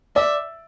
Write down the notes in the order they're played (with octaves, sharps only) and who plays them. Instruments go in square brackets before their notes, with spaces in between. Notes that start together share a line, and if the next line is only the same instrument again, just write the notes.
[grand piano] D5 [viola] E5